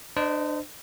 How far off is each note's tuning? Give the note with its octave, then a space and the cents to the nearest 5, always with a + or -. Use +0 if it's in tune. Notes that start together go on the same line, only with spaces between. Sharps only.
D4 +25 C5 -30 D#5 +0